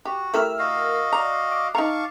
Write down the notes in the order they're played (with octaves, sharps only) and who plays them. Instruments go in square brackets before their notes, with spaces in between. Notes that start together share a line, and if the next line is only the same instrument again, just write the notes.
[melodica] F#4 [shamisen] G4
[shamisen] A3 E4 G4 [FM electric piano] A#4 E6 F6
[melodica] F#4 D#5 F5
[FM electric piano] D5 [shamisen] A#5
[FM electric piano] D6
[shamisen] D#4 A#5 [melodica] F5 A5 C#6